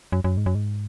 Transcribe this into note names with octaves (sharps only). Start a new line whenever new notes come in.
F#2
F#2
G#2
F#2
G#2